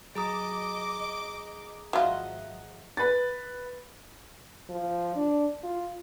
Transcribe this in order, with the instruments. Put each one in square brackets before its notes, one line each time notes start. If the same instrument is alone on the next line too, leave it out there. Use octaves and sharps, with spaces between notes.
[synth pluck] F#3 [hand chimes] G#4 A#5 D#6 [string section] D#5 D6
[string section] G#1 F3 [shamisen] F#3 F4 [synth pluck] D#5 E5 F#5
[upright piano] B4 A6
[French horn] F3
D4
F4